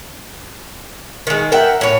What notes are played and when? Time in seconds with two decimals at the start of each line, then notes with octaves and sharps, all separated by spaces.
1.27 D#3 G#3
1.52 A#4 E5 F#5 G5
1.81 A2 C#5